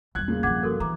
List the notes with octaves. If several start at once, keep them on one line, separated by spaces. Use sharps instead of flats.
E2 G3 F#6 G#6
A#2 C#3
G2 F3 F#5 D6 G#6
F#4 A4 A#4
E3 A#5 D6